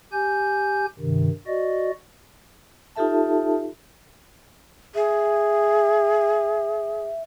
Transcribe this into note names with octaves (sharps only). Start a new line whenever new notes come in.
G4 G#5 G6
G2 C3 D#3
F#4 D5 D#5
D#4 F4 G4 A4 E5 A5
G#4 E5